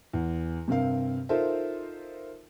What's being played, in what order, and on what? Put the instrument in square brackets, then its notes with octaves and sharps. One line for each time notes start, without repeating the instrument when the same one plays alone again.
[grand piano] E2
G2 C3 C4 A#4 F5
D#4 F4 A4 A#4 C5 E5